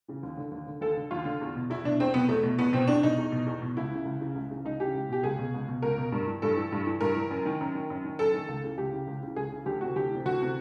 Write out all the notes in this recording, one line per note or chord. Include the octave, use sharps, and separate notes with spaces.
C#3 E3
D#2
D3
D#2
D3
D#2 A4
D3
D#2 F4
D3
E2
B2
E2 E4
B2 D4
E2 C4
B2 B3
E2 A3
B2
E2 B3
B2 C4
E2 D4
B2 D#4
E2
B2
E2
B2
C#2 E4
C#3 E3
C#2
C#3 E3
C#2
C#3 E3
C#2 D#4
C#3 E3 G4
C#2
B2 G4
C#2 G#4
B2
C#2
B2
C#2 A#4
B2
G2
E3
G2 A4
E3
G2
E3
G2 A#4
E3
F#2
D#3
F#2
D#3
F#2
D#3
F#2 A4
D#3
C#2
C#3 E3
C#2 G4
C#3 E3
C#2
C#3 E3
C#2 G#4
C#3 E3
D2 G4
C3 E3 F#4
D2 G4
C3 E3
D2 F#4
C3 E3